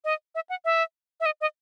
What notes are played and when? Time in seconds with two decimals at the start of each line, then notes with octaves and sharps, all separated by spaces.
0.05 D#5
0.35 E5
0.50 F#5
0.65 E5
1.20 E5
1.26 D#5
1.41 D#5